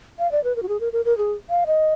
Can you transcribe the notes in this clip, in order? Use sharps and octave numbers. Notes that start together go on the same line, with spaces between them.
F5
D5
B4
A#4
F#4
G#4
A#4
A#4
A#4
G#4
F5
D#5